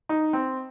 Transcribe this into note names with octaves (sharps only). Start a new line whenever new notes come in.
D#4
C4